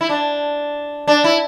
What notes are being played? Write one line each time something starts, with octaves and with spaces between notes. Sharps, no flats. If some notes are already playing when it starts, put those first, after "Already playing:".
E4
D4
D4
E4